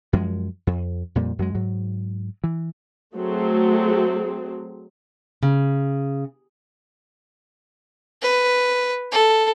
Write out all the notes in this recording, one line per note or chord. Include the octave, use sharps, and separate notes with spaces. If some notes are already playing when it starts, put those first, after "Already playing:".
F#2 F3 G#3
F2
F2 A#2 G3
F#2 F#3 G#3
G#2 F#3
E3
F#3 A3 C4 G#4
C#3
B4
A4